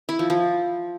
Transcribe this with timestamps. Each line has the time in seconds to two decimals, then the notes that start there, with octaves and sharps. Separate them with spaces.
0.09 E4
0.19 F3
0.30 F3